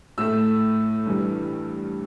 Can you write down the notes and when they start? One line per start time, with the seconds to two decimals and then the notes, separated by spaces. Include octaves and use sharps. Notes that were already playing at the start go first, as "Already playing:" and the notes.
0.18 A2 A3 E6
1.06 G2 E3 G3